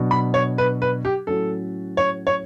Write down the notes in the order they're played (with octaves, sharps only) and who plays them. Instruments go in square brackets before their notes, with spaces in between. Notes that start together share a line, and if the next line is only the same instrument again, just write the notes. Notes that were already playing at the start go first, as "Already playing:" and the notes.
Already playing: [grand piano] B2 F#3 B3 D4 F#4
[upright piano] B5
C#5
B4
B4
G4
[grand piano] A2 F#3 C#4 F#4 [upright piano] A4
[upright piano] C#5
C#5